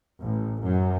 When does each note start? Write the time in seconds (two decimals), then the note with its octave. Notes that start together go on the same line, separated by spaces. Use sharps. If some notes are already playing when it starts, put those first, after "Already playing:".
0.20 A1
0.62 F#2